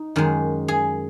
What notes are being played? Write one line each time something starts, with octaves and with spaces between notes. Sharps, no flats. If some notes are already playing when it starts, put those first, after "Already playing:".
Already playing: D#4
F#2 D#3 G#3
G#4